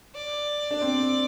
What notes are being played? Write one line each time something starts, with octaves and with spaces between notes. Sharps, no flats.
D5
D4
C4